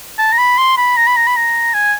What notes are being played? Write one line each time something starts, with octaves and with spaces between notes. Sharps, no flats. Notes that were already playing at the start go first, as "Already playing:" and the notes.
A5
A#5
B5
C6
B5
A#5
B5
A#5
B5
A#5
G#5